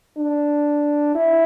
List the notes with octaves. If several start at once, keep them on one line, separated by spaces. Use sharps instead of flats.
D4
E4